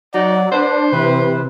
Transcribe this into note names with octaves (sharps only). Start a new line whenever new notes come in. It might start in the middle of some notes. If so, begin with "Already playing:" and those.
F#3 D#4 D5 F#5
D4 B4 C5
C3 E3 B4